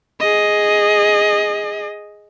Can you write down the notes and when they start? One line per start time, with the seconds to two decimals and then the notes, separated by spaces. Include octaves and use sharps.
0.20 G#4 D#5